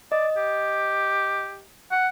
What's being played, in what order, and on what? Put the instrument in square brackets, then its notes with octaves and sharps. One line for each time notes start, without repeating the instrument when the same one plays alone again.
[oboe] D5 [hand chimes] D#5
[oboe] G4
F#5